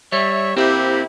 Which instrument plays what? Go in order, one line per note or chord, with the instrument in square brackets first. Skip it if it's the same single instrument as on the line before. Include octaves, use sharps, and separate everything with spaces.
[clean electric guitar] G3 [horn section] C#5 E5
[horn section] C3 A#3 E4 [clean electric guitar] C4 [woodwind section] G4